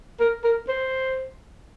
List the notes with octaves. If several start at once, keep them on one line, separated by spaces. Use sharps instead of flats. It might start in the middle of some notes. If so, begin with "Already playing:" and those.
A#4
A#4
C5